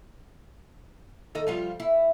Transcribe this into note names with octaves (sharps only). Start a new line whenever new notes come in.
D#3 A4 D#5
F3 G3 F4
E4